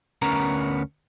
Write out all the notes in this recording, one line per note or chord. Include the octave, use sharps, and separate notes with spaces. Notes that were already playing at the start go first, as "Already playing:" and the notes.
D2 B3 C#4 A#4 A#5